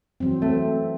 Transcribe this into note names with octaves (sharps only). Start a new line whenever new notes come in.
E3 F#3 C4
A3 C4